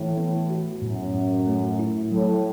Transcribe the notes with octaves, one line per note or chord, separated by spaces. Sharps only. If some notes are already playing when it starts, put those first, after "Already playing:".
Already playing: A2 E3
B3
F#4
F#2 A2
A2
A3
E4
A2 F#3